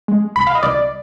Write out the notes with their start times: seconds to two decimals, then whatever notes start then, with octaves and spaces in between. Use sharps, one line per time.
0.08 G#3
0.36 C2 B5
0.47 F5
0.55 D#5
0.63 C2 D5